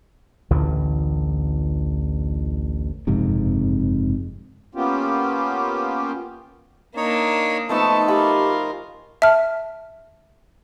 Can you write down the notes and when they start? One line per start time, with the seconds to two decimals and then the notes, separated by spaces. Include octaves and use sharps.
0.50 A1 D2 D3 E3
3.07 F#1 F2 G#2 C3
4.75 A#3 B3 C#4 F4 G4
6.97 A#3 D4 D#4 C#5
7.69 F3 A3 B3 D#4 A4 A5
8.08 F4 G4 A#4 G#5 B5 C#6
9.22 E5 A5 F6